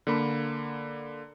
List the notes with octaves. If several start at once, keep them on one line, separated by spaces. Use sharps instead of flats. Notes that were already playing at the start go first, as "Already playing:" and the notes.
D3 A#3 B5